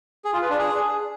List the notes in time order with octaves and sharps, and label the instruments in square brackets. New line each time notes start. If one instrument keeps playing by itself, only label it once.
[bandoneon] G#4
F4
B4
D4
G#4